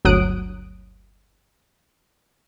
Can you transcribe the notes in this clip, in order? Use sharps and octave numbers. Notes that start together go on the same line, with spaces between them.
G1 D2 F#3 D#6 F#6 D7